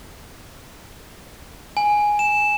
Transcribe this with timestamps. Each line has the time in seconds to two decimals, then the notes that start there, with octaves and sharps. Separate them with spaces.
1.77 G#5
2.19 E7